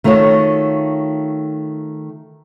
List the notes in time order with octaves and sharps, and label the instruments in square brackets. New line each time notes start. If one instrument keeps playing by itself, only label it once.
[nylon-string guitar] D#3 A3 F4 F#4 C#5